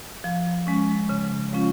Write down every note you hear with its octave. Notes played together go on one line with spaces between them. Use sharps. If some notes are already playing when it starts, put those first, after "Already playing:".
F3
G#3 C#4
C#3
F3 G#3 C#4 F4